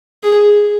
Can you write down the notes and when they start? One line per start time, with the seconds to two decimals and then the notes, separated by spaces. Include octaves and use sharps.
0.23 G#4